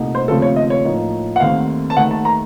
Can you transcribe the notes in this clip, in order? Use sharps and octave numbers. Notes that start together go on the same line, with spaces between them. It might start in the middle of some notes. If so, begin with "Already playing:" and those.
Already playing: C2 A#2 A3 D#4
C5
D#2 C#3 F3 A3 C4 A4
C#5
D#5
C#5
A2 F3 A#3 D#4
F#5
D#2 D#3 A3 C4 F5
A5
D#2 D#3 A3 F#5
A5
A#5